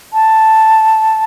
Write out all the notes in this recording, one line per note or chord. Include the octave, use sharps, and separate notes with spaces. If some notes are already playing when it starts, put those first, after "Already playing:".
A5